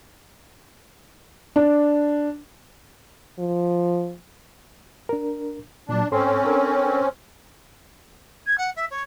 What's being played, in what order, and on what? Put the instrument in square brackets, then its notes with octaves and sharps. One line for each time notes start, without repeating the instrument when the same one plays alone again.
[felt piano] D4
[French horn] F3
[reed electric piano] D4 A#4
[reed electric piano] A#2 F#3 [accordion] D4
[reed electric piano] G#2 A4 C6 [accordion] C4 C#4
[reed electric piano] D4 A4 A#4
[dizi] G#6
F#5
E5
C#5